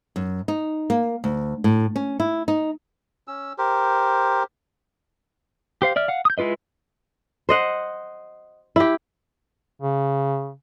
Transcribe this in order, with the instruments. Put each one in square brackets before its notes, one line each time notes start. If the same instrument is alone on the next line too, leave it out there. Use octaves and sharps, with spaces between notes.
[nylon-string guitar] F#2
D#4
A#3
D2
A2
C#4
E4
D#4
[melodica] C#4 E6
G4 A#4 C5
[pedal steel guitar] G4 C5 F5
D5 E5 F6
F5 F#5
D#6 G6
G#3 E4 F4 B4 D#5
[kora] C5 D#5 F#5
E4 G4
[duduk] C#3